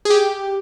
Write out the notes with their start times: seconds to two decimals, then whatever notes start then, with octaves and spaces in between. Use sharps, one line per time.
0.05 G#4
0.10 G4